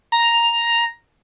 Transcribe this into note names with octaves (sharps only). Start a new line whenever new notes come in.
A#5